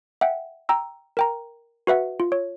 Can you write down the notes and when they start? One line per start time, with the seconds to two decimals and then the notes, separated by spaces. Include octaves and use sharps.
0.21 E5 F#5 G5
0.69 G5 A#5 E6
1.17 A#4 G5 A#5
1.87 F#4 B4 E5 F#5
2.20 F4
2.32 C#5